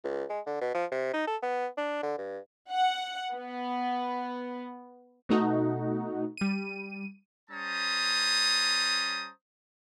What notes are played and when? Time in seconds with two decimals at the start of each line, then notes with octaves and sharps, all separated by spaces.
0.04 C#2
0.30 G#3
0.47 D3
0.61 B2
0.75 F3
0.92 C3
1.13 D#4
1.27 A4
1.42 B3
1.77 D4
2.03 D3
2.18 G2
2.70 F#5
3.34 B3
5.29 B2 A3 D#4 F#4
6.37 G3 D#7
7.50 G3 C#4 C5 A5 A#5 D#6